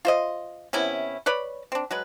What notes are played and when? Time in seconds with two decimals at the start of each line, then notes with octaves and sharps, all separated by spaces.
0.05 F4 C5 D#5
0.73 C3 B3 C#4 E4
1.26 B4 C#5 D5 B5
1.72 C4 D4
1.91 F#3 G#3 B4